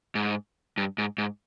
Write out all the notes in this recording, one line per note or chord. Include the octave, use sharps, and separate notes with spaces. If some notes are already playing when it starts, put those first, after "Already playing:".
G#2
G2
G#2
G#2